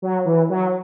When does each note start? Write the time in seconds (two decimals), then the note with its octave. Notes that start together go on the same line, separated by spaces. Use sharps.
0.02 F#3
0.25 E3
0.50 F#3